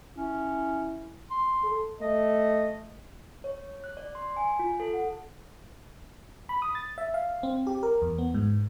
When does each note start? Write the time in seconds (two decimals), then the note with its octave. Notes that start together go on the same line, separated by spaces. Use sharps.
0.17 C#4 E4
1.31 C6
1.63 A4
2.01 A3 D#5
3.44 C#5
3.84 F#6
3.97 D5
4.15 C6
4.37 G#5
4.59 F4
4.80 A4
4.94 F#5
6.49 B5
6.62 D#6
6.75 A6
6.98 E5
7.14 F5
7.43 C4
7.67 G4
7.83 A#4
8.02 E2
8.18 B3
8.34 G#2